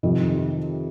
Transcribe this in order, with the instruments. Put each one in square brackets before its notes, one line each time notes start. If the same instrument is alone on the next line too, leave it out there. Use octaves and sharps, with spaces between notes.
[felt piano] F2 C3 D#3